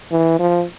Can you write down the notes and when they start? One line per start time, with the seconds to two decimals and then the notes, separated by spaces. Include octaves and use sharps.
0.12 E3
0.39 F3